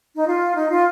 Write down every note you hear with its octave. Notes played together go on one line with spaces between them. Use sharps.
D#4
F4
D#4
F4